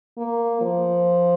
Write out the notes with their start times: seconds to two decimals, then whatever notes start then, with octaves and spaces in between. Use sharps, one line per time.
0.18 A#3
0.61 F3